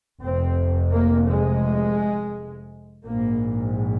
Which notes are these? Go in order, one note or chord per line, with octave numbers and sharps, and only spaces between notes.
F1 F2 C3 C4
A#3
G#3
A#1 G#2 A#3